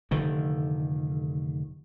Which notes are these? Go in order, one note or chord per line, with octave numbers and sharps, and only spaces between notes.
F1 D3 D#3